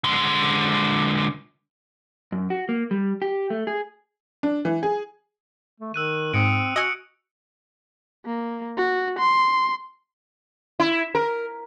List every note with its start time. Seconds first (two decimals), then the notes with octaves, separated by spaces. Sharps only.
0.04 D3 G#3
2.32 F#2
2.50 F#4
2.69 A#3
2.91 G3
3.22 G4
3.50 A3
3.67 G#4
4.43 D4
4.65 E3
4.83 G#4
5.80 A3
5.94 D#3 E6 F#6 D#7
6.34 G#2 C4 D#6 C#7 D7
6.76 F#4 D#5 G#5 E6 C#7 D#7
8.26 A#3
8.78 F#4
9.19 C6
10.80 E4
11.15 A#4